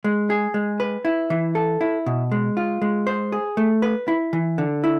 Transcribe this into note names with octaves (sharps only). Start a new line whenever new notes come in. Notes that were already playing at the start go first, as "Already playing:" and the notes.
G#3
G#4
G#3
B4
E4
E3
A4
E4
B2
G#3
F4
G#3
C5
G#4
A3
B4
E4
E3
D3
E4